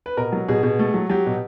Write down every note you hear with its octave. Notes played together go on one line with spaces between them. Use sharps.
B4
B2 A#4
F#3
B2 G#4
B2
A3
F#3
F#3 G4
B2